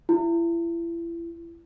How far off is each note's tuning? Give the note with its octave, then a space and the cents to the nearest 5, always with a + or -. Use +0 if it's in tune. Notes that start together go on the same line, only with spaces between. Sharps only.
E4 +35